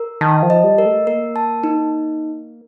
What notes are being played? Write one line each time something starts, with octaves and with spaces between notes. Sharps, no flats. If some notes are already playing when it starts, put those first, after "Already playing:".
Already playing: A#4
D#3 A5
F3
D#5
G3
A#4
A3
A#3 A#4
A5
D#4